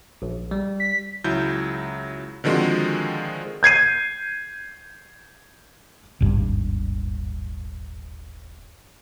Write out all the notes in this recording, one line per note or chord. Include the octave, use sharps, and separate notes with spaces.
A#1
G3
B6
C#2 F#3 E4 G6
D3 D#3 F3 G#3 C4 F#4
G6 G#6 C7 D#7
D#1 G#1 G2